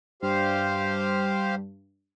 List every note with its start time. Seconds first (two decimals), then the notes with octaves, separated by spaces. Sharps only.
0.22 G2 G4 C5 F5